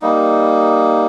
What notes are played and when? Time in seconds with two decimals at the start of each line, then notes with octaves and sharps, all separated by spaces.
0.02 G3 A#3 D#4